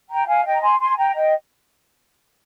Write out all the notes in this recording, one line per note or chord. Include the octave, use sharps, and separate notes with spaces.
G5 A#5
F5 G#5
D#5 G5
A#5
G#5 C6
G#5 C6
G5 A#5
D#5 G5